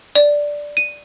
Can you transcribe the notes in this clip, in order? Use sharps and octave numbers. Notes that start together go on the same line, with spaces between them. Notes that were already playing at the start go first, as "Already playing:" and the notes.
D5
D#7